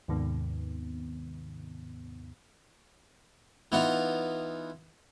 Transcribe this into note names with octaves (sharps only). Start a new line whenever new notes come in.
D#2 G#2 C3 D#3 B3
E3 B3 D#4 F4